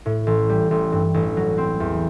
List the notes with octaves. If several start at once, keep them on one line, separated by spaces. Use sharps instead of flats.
A2
A1
G3
A1
G2
A1
F#3
C4
E2